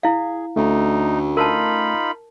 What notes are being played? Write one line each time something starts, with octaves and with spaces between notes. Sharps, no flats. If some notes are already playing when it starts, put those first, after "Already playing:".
E4 G#4 F5
D2 A3 C#4 D#4
D#4 F4 A#4 A5 B5